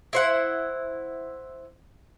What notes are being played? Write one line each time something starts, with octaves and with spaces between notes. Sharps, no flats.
E4 C5 F#5